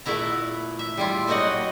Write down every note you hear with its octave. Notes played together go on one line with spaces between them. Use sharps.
A#2 A3 B3 E4 A#5
E5
G3 E4 F4
F#3 A#3 D#4 F#4 D#5 F#5